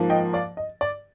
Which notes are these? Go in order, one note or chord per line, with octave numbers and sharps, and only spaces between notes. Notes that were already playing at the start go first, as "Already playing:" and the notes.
Already playing: G#2 F3 A#3
D#5 G5
D5 F5
D#5
D5